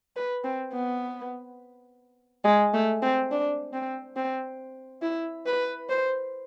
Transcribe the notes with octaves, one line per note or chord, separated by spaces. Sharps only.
B4
C4
B3
G#3
A3
C4
D4
C4
C4
E4
B4
C5